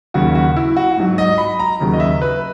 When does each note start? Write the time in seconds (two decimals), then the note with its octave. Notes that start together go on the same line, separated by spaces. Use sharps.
0.14 D#2 C#3 F#3 F#4
0.35 F#4
0.56 E4
0.77 F#4
0.97 G#2 F#3
1.18 D#5
1.38 B5
1.59 A#5
1.80 D#2 C#3 F#3
1.93 D#5
2.00 E5
2.22 B4